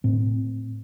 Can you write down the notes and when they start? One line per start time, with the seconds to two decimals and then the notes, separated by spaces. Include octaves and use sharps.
0.04 A2 C4